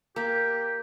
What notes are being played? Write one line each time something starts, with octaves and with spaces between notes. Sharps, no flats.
A#3 G4